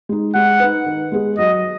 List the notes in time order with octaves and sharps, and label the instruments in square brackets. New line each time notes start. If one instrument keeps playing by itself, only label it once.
[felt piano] G#3 D#4
[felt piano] G#3 [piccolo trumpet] F#5
[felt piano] D#4 B4
D#3
G#3 B3 G#4
[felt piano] F#3 [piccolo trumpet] D#5